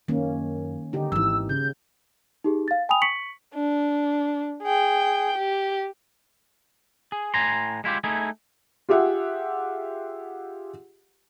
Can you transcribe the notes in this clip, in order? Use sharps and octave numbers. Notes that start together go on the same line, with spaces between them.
F#2 D#3 A#3 C#4
D3 D#4 G4
G#1 E3 E6
C#3 G6
D#4 G4 G#4
F5 A6
G5 G#5 B5 D#6 F7
C#6 B6 C#7 F#7
D4
G#4 G5
G4
G#4
A2 G#5 A#5 C6
G#3 E4 F4 G4
A3 D#4 E4 G#4
F4 G4 G#4 E5 F#5